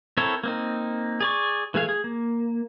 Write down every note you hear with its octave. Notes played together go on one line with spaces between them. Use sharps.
C4 E4 A4 A#4 C#5
A#3 C4 D#4
G#4 D5 C#6
E3 A3 G#4 F5
G#4
A#3